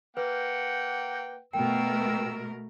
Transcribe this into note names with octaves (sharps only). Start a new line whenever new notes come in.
A#3 B4 F#5 G5
B2 A3 A#4 G5 E6